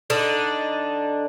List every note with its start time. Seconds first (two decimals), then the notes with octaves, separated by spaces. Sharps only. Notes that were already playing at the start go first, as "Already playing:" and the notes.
0.10 D3 D4 D#4